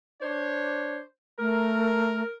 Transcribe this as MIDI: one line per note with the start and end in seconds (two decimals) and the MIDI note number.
0.21 1.01 62
0.21 1.01 72
0.21 1.01 73
1.39 2.23 57
1.39 2.32 70